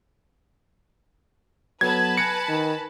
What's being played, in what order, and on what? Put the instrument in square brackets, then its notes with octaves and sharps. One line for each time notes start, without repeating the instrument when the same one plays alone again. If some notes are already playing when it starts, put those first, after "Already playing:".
[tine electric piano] F#3 B3 A4 [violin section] B4 A5 B5 [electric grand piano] G#6
[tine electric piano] G#5 F#6 A#6 [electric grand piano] C#7
[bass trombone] D#3